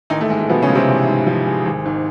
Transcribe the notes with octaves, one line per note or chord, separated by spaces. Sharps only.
A1 D#3 D#4
A3
G#2 G#3
A3
B2 F3 B3
C#3 C#4
G#3
C3 C4
A1
G#2
F3
G#3
G#1
G#2